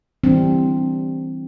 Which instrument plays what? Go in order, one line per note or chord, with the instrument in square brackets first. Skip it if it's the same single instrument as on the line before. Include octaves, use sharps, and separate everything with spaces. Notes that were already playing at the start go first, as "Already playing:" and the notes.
[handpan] E3 G3 C4 D4